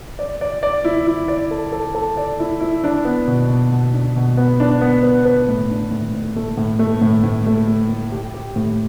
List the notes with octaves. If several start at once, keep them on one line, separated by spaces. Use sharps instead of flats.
D5
D5
D5
E4
E4
D5
A4
A4
A4
D5
E4
E4
D4
B3
B2
B2
B2
D4
B2
B3
D4
B3
B4
B4
A2
D4
A2
A2
A3
A2
A3
A2
A2
A3
A3
A3
G4
G4
A2